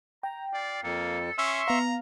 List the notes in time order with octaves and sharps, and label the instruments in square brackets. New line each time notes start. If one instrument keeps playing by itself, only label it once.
[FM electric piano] G5 [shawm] A#5
[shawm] F4 [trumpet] D5
[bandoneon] F2 [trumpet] A#3 [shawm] A4
[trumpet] C#4 [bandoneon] E5 C6 [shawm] C#6 [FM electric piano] E6
[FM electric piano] B3 F5 [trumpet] A#5